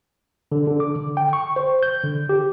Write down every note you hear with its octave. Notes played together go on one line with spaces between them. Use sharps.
D3
D3
D6
D3
G5
C#6
C5
G6
D3
G4